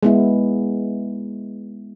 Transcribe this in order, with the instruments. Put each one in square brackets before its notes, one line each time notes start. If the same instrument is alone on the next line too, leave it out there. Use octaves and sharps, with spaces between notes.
[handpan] G#3 B3 E4